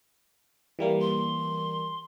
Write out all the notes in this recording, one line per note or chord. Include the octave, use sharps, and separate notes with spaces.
E3 G3 A#3
C6